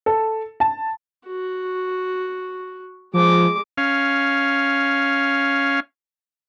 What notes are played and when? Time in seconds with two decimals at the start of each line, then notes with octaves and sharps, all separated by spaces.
0.06 A4
0.60 A5
1.27 F#4
3.14 F3 G#3 D6
3.78 C#4 F5